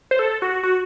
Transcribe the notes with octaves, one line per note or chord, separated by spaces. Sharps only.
C5
A4
F#4
F#4